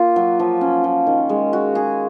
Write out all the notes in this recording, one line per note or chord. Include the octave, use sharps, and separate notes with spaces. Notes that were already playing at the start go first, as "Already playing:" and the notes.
Already playing: A#3 F4
F#3
F3
C#4
F3
D#3
G#3
F#4
G#4